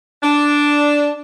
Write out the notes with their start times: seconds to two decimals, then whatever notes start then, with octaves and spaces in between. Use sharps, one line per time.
0.23 D4